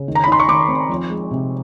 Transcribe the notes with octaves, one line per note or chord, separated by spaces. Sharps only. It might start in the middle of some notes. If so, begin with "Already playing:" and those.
Already playing: C#3
D#3
A#5
B5
D#4 C6
C#6
D#3 D6
C4
F3
G#3
C3